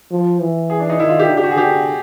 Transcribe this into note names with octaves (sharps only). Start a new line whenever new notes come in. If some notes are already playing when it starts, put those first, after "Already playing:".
F3
E3
G#4
D4
D#4
D#3 E4
F4
G4
D3
G4
F#4
G#4
D3 G4